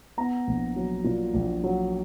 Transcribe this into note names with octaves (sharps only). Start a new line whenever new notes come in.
B3 A#5
A#1
F#3
A#2
A#1
F#3